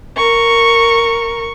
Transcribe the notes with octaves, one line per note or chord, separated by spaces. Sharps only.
A#4 C#6